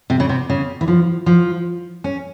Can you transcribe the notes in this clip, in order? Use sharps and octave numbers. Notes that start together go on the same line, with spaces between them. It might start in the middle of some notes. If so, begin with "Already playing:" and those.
C3
C#3
C3
C#3
E3
F3
F3
C#4